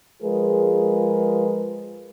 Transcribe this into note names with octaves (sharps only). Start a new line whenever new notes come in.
F3 G#3 F4 G#4 A#4 B4